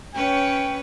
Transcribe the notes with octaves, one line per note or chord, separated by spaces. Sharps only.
C#4 B4 C#5 G5